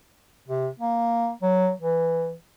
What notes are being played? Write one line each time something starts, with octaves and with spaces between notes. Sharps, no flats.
C3
A#3
F#3
E3